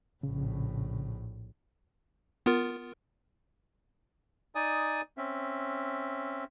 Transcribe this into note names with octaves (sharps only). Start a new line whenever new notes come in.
A#1 A2 C#3
B3 F4 A#4
D#4 D5 G#5 D#6
C4 C#4 E5